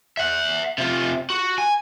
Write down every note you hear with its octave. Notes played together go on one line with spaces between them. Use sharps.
E5 F#5
C3 F4
F#4
G#5